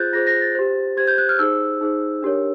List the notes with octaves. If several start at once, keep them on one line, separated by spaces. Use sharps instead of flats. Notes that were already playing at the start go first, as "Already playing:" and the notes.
Already playing: F4 G#4 C5 F#6 G6 A6
F4 G#4 C5 A#6
A#6
A6
G4 C5
G4 C5 G#6
G6
F#6
F6
D#4 G#4 C5 E6
D#4 G#4 C5
D4 G4 A#4 C#5